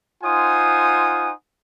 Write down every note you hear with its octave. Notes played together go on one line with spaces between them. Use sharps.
D#4 F4 C5 F#5 G#5 D#6